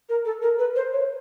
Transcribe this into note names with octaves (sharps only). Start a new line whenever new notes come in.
A#4
A4
A#4
B4
C5
C#5